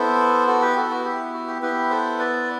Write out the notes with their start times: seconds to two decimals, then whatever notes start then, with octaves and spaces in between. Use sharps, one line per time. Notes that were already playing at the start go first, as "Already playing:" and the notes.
Already playing: B3 E4 A4 C5
0.47 F#4 A4
0.61 G4 B4
0.76 F#4 A4
0.90 F#4
1.05 G4
1.34 F#4
1.48 G4
1.62 B3 E4 G4 B4
1.90 A4 C5
2.19 B4 D5